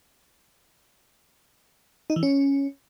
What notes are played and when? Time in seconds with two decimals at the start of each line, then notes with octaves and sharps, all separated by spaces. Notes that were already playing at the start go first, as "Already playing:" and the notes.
2.10 D#4
2.16 E3
2.23 C#4